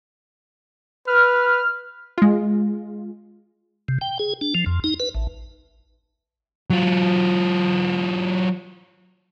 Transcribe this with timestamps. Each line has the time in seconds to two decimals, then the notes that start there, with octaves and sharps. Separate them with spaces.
1.07 B4 F6
2.18 G#3 F4
3.88 C3
4.01 G5
4.19 G#4
4.41 D4
4.55 F3
4.66 F2
4.84 D#4
5.00 B4
5.15 A1
6.70 F#3 F4